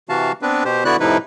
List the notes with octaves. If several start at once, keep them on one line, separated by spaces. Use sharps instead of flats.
C3 E3 F#4 F5 A5
B3 C4 D4 B4
B2 G4 C5
D3 B3 E4 F#4 D5 F#6
A2 C3 F3 D#4 E4 B4